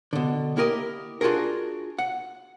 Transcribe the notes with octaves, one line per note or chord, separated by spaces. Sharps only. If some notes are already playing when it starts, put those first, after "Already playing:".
B2 D3
A#3 E4 G4 A#4 D#5
D4 F4 F#4 G#4 A#4
F#5